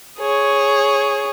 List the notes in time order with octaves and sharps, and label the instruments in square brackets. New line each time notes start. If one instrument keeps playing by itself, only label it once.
[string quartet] G#4 C#5